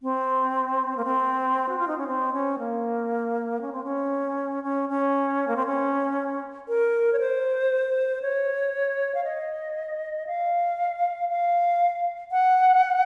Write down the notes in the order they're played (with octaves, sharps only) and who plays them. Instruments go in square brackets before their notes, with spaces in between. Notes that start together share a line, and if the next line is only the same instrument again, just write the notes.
[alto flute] C4
A#3
C4
F#4
F4
D#4
C#4
C4
C#4
A#3
C#4
C4
C#4
C#4
C#4
A#3
C4
C#4
A#4
C#5
C5
C#5
F5
D#5
F5
F5
F#5